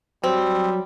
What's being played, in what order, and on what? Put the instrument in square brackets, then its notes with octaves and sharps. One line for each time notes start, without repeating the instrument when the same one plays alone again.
[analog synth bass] F#3 [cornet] G3 [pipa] C4